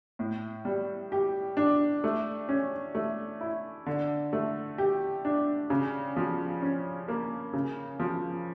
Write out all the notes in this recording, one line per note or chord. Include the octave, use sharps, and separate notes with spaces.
A2
G3
G4
D4
A3
C#4
A3
E4
D3
A3
G4
D4
C#3
F3
C#4
A#3
C#3
F3